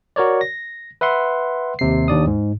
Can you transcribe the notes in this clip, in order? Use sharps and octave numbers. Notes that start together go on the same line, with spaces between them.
F#4 A#4 C#5 D5
A#6
B4 E5 F#5 C6
D#2 C3 C7
D#2 D4 D5 D#6
G#2